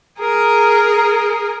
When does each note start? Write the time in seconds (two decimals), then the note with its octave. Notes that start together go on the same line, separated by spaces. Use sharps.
0.19 G#4 A#4